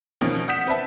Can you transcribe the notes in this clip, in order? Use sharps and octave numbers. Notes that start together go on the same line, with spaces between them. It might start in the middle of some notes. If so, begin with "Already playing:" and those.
B2 D#3 F3 A#3 C#4
F#5 D#6 G6 B6 E7
C4 B4 E5 A5